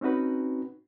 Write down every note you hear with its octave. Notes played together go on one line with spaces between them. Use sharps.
C4 C#4 D#4 F#4 B4